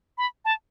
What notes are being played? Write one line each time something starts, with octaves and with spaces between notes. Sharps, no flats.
B5
A5